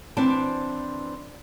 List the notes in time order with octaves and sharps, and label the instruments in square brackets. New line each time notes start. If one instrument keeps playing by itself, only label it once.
[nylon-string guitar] E3 C4 D4 C5 D5 A5